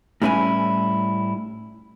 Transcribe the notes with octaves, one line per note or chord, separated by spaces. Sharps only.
A2 G3 C#4 E4 B4 G#5